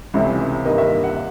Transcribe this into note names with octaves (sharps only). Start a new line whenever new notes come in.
C#2 C3 E3 A3 C#4
G2 D#3 G3 A#3 D#5
E5
F#5